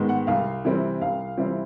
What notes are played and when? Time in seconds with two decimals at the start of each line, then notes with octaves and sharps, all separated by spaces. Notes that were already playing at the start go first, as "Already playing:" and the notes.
Already playing: G#2 D#3 G#3 B3
0.09 F#5
0.27 C2 F5
0.65 C3 E3 G3 C4
1.01 C2 F5
1.37 C3 E3 G3 C4